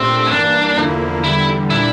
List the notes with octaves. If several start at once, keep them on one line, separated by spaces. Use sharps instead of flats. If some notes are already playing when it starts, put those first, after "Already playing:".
Already playing: A#2 A3 C4 D4 G4
E4
G2 E3 A#3 D4
E2 D3 F3 A#3 E4
E2 D3 G3 E4
A#2 G3 D4 E4